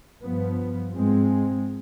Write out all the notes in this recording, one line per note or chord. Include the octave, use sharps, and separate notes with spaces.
G2 F3 B3
G#2 F3 G#3 C4